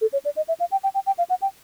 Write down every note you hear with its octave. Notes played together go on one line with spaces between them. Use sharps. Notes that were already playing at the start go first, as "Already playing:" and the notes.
A4
C#5
D5
D#5
E5
F5
G5
G5
G5
G5
F5
F#5
G5